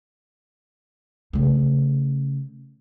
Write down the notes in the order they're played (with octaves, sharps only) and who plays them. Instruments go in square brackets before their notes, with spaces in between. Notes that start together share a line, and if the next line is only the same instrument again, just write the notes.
[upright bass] C#3 A3